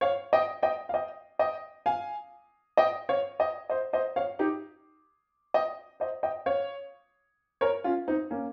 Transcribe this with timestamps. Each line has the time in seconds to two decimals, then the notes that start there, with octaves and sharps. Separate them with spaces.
0.01 C#5 F5
0.33 D#5 G5
0.63 D#5 G5
0.89 F5
0.94 D#5 G5
1.39 D#5 G5
1.86 F5 G#5
2.77 D#5 G5
3.09 C#5 F5
3.39 D#5 G5
3.70 C5 D#5
3.93 C5 D#5
4.16 C#5 F5
4.39 D#4 G4
5.54 D#5 G5
6.00 C5 D#5
6.23 D#5 G5
6.46 C#5 F5
7.61 A#4 C#5
7.84 C#4 F4
8.08 C4 D#4
8.31 A#3 C#4